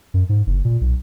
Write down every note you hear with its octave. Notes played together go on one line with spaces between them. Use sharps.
F#2
G#2
F#1
A#2
B1